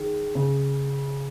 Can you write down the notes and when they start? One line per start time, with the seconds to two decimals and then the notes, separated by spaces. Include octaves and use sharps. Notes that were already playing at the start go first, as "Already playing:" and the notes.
Already playing: D#3 G#4
0.35 C#3